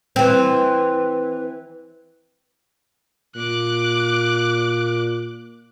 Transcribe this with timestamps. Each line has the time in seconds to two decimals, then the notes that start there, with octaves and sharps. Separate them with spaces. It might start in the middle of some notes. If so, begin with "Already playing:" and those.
0.16 E3 C4
3.36 A#2 D6 F#6